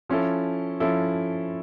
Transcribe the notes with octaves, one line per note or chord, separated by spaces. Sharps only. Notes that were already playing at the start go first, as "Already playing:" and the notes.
F3 C#4 E4 A4
F3 C#4 E4 A4